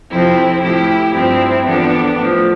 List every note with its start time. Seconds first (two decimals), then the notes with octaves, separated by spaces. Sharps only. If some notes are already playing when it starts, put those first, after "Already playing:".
0.11 F2 C3 F3 C4 E4
0.62 A2 F3 E4 G4
1.14 G2 F3 C4 E4
1.65 E2 D3 F3 B3 D4
2.17 A2 F3